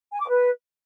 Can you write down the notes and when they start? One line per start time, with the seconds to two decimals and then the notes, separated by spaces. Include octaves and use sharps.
0.13 G#5
0.21 D6
0.29 B4